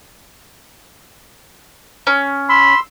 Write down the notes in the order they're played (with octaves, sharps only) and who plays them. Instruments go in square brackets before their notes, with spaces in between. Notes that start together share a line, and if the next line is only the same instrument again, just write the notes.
[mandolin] C#4
[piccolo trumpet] B5 [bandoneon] C6 E6